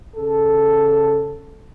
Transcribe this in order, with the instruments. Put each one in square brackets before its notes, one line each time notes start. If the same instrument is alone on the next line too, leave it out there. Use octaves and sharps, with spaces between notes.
[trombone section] C#3 A4